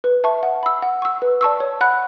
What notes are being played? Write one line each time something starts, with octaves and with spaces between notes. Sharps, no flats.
B4
E5 A5 C#6
F#5
B5 E6
F#5
C#6 E6
B4
D5 A5 C#6 E6
C#5
F#5 B5 F#6